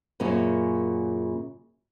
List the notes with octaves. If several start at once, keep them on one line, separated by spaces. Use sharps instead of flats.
F#2 A#2 C#3 A#3 C#4